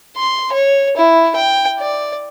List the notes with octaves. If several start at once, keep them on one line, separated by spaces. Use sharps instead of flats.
C6
C#5
E4
G5
D5